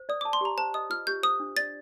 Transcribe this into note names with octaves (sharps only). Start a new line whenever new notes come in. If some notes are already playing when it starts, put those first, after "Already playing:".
Already playing: C5
D5 D#6
A5 D6
C6
G4 A#5
C5 A5
D#5 D#6
F4 F6
G4 G6
C5 D#6
D4
D5 A6